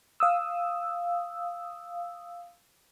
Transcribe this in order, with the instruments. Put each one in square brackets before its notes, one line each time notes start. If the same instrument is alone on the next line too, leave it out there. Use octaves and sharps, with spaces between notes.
[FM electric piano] F5 D#6 E6